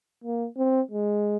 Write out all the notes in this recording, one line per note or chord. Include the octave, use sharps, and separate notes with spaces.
A#3
C4
G#3